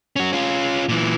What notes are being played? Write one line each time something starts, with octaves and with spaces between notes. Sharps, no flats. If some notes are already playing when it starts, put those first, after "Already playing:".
C#4 F#4
C#4 F4
A#2 E3